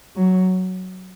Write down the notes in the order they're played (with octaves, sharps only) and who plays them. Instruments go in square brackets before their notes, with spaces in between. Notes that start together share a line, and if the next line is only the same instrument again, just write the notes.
[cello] F#3